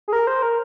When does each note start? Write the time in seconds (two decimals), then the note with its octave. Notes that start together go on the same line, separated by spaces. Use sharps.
0.08 G#4
0.13 A#4
0.27 C5
0.42 A#4